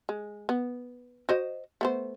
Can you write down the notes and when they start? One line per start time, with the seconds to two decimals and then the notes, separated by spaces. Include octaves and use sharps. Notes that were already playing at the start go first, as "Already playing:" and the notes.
0.09 G#3
0.49 B3
1.29 F#4 C5 D#5
1.81 A3 B3 C5